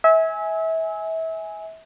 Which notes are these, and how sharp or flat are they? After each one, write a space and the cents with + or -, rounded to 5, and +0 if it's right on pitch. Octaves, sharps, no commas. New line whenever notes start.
E5 -30 G#5 +0